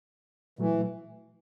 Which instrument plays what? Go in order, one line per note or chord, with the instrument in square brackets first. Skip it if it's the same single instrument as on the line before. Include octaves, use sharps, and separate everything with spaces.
[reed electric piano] A#2 F#3 A3 [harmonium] E3